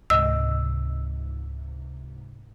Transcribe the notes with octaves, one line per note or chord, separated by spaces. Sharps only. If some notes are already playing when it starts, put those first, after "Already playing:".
C#2 G#2 C3 D#5 E6